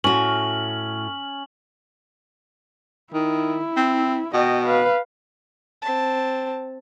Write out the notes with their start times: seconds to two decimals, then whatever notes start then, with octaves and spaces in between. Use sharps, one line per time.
0.04 A2 C#4 F#4 F#7
3.13 D#3 E4
3.77 C4
4.34 B2 D#5 G5
4.66 B4 F5
5.82 C4 A5